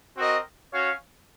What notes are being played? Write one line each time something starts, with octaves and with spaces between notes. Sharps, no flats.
C4 F#4 A#4 D#5
C#4 F#4 C#5 F5